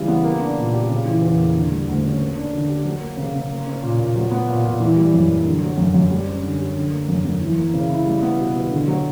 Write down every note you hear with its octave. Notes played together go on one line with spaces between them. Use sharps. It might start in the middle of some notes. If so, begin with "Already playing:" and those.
Already playing: C#3 E3 G3
B3
A#3
D4
A#2
G4
C#3
E3
E2
A#3
D3
G3
D2
C#4
A#3
D4
D3
G4
F#3
A#3
C#3
C#3
A#3
C#4
A#2
A#2
F#3
B3
A#2
A#2
E3
G3
F#2
A#3
D3
F#3
F#2
F#2
G3
C#4
D3
G4
D3
A#3
F#2
F#2
E3
A#3
C#3
E4
G3
B3
B2
B2
D3
F#3